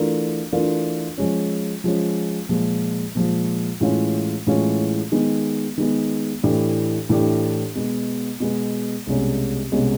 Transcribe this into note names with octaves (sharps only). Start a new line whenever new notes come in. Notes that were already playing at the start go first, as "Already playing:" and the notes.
Already playing: E3 A3 D4 F4 A#4
E3 A3 D4 F4 A#4
F3 G#3 C#4
F3 G#3 C#4
A#2 F3 G#3
A#2 F3 G#3
A2 E3 G#3 C#4 F4
A2 E3 G#3 C#4 F4
D#3 G#3 B3
D#3 G#3 B3
A2 E3 A3 D4 G4
A2 E3 A3 D4 G4
B2 G#3 B3
B2 G#3 B3
C2 B2 G#3 C#4
C2 B2 G#3 C#4